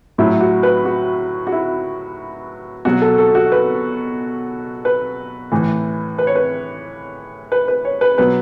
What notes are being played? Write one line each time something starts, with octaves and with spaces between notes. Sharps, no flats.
A2 F#3 E4
F#4
B4
F#4
F#4
E4
B2 F#3 F#4
A4
A4
F#4
B4
B4
A2 E3
B4
C#5
B4
B4
B4
C#5
B4
B2 F#3 B4